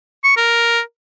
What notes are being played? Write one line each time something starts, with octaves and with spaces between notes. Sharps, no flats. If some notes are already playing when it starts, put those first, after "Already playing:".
C#6
A#4